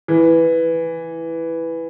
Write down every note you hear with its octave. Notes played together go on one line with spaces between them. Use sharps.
E3